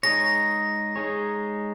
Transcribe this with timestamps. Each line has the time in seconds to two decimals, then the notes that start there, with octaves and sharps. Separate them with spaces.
0.03 G#3 D#4 G#4 C#5 A#6
0.96 G#3 D#4 G#4 C#5